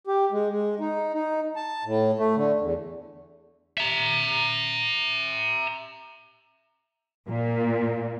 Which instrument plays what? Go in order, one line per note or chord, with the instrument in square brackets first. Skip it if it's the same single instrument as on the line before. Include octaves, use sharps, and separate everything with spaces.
[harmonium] G4
G#3
G#3
D#4
D#4
A5
A2
A3
D3
E2
[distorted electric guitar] E5 A#5
[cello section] A#2